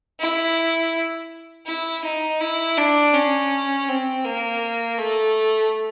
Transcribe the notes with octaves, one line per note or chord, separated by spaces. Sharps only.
E4
E4
D#4
E4
D4
C#4
C4
A#3
A3